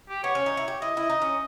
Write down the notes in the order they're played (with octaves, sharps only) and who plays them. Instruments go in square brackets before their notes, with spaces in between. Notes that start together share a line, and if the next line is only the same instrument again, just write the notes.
[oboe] G4
[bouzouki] B3 [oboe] C#5
[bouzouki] C#4
D#4
E4
G4
[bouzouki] E4 [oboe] D#5
[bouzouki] E4
D#4
C#4